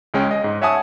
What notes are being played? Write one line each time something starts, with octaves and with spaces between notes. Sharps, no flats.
C#2 G#3 C#4 G5
D#5
G#2
C#5 E5 F#5 G#5 A5 D#6